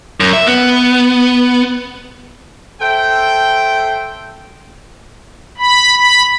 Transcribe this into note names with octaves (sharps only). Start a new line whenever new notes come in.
F#2
E5
B3
A4 C5 E5 G5
B5
B5